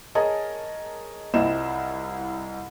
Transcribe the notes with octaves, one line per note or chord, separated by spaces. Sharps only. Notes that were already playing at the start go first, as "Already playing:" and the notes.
G#4 A#4 C#5 D#5 A5 A#5
C2 C4 E4 F4 D#5 E7